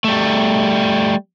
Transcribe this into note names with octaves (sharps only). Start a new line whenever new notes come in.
G3 A3